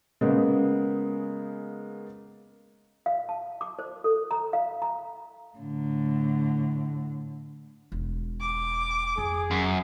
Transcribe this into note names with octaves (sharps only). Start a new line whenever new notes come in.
C#3 G#3 A#3 B3
F5
A5
D6
C5
A4
A#5
F5
A#5
A2 D3
E1
D6
F2 G#4
F#2